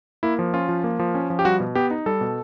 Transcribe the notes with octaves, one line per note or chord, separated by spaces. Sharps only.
A#3 E4
F3
C#4 F4
F3
A#3
F3
C#4
F3
G4
G3 F#4
B2
B3 G4
D#4
G3 A4
B2